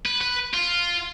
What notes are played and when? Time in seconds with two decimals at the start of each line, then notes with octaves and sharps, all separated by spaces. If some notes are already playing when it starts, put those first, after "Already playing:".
0.06 B4
0.21 B4
0.53 F4